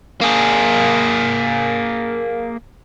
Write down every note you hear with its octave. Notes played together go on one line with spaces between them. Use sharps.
A#3 G#4